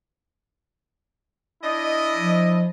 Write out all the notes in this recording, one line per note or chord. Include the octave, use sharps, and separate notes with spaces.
D4 E4 D#5
F3